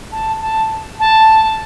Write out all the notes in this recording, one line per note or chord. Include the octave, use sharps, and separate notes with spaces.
A5
A5
A5